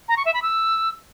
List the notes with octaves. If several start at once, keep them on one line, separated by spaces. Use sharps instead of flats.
A#5
C#6
E5
B5
E6